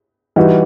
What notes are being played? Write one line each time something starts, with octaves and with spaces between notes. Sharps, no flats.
E3 G3 D#4 F#4